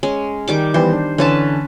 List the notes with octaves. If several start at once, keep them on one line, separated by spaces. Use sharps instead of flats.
G#3 C#4
D#3 G3 D6
E3 G3 B3 C5
D4
D3 E3 C#4 B4 A5